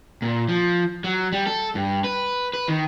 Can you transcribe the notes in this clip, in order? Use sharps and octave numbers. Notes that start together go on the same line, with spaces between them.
A#2
F3
F#3
G3
A4
G2
B4
B4
D#3